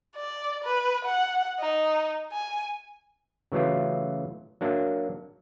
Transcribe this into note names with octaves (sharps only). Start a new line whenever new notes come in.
D5
B4
F#5
D#4
G#5
C#3 E3 F#3 A3 F4
F#3 A#3 D4 E5